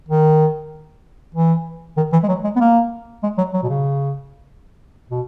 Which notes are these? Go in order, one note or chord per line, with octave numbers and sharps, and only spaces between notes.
D#3
E3
D#3
E3
G#3
F#3
G#3
B3
A#3
G#3
F#3
F#3
B2
C#3
B2